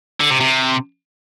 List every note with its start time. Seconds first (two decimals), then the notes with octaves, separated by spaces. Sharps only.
0.20 D3
0.31 C3
0.41 C3